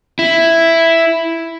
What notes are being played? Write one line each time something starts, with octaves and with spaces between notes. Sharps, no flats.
E4